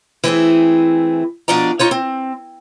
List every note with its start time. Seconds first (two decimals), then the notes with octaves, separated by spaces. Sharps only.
0.24 E3 A3 C4 G#4
1.48 B2 F3 D4 D5 A#5
1.79 D#4 F4 C#5
1.91 C4